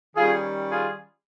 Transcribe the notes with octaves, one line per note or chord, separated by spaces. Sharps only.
D#3 G3 C#4 F4 G#4
F4 G#4